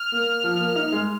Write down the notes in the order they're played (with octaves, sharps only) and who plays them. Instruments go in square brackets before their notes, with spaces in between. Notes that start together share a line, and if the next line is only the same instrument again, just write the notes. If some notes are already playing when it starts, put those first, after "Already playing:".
Already playing: [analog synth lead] F6
[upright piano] A#3
F3
A#3
D#4
G#3